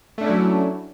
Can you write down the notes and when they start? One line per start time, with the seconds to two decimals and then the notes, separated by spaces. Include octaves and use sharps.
0.18 A3
0.21 D4
0.24 C#4
0.27 E4
0.29 F#3